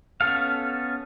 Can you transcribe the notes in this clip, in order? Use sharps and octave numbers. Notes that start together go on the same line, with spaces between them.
B3 C#4 A4 F5